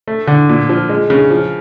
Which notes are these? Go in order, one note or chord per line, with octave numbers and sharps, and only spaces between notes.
A3
D3
A#2
F3
G#3
C#3
F3